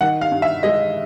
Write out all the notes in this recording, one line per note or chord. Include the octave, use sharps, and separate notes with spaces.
D#3 F#5
F5
G2
E5
G#3 D#5